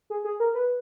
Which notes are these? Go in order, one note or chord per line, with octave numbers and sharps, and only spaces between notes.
G#4
G#4
A#4
B4